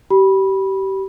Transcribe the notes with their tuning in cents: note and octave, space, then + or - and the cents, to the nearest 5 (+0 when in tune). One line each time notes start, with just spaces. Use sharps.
G4 -30 B5 -15